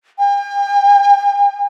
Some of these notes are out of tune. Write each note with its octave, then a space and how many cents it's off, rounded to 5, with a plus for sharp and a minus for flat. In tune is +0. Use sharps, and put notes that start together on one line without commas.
G5 +45